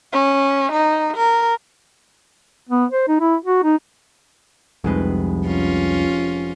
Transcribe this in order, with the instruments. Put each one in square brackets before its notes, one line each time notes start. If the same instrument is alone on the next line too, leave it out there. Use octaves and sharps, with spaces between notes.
[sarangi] C#4
D#4
A#4
[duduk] B3
C5
D#4
E4
F#4
D#4
[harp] F1 G#3 B4 [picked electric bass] C2 F2
[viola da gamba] C#4 F4